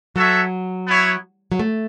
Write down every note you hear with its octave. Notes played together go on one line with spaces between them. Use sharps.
F#3 F#4 A4 C#5 E5
B3 E4 C#5
F#3
A3